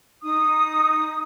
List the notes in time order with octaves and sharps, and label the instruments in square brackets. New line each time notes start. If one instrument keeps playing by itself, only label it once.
[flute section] D#4 D#6